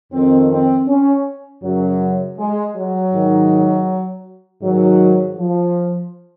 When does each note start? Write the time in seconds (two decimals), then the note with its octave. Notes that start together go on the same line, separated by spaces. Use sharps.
0.13 F2 D#3 C4
0.50 C4
0.88 C#4
1.63 F#2 C#3 F#3
2.38 G#3
2.75 F#3
3.13 G#2 D#3
4.62 G#2 D#3 F#3
5.37 F3